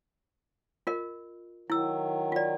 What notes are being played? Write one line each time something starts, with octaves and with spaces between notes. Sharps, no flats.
F4 A#4 D#5
D#3 F#3 E4 E6
F4 D5